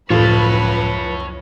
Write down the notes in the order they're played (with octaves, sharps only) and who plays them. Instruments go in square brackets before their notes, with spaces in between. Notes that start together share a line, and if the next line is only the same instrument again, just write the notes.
[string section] C#2 F#2 B4 [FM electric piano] A2 [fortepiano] F3 A4 [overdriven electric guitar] C#5 A5